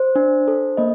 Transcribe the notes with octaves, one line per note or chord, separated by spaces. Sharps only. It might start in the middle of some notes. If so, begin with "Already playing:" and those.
Already playing: C5
D4
A4
A#3 D#5